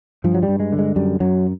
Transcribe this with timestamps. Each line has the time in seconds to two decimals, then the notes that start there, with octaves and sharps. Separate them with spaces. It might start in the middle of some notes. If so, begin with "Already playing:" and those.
0.24 G2 F3
0.34 F#3
0.43 G3
0.48 G2
0.60 G#3
0.73 D3
0.79 G#3
0.96 F#2 G3
1.20 F#2 F#3